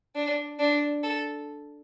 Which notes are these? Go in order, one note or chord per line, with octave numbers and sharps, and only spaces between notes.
D4
D4
A4